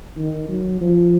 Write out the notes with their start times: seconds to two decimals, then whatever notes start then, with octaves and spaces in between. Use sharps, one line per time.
0.17 D#3
0.49 F#3
0.81 F3